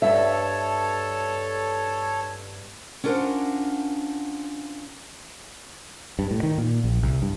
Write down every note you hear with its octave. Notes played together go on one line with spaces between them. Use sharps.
G2 A4 C#5 E5 A5
C#4 D4 F4 A#4 C5 F#5
G2
A2
D#3
A#2
A#1
C2
G2